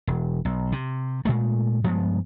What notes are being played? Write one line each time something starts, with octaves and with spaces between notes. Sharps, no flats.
E1
B1
C3
A#2 G#3 A3
G2 F3 G#3 B3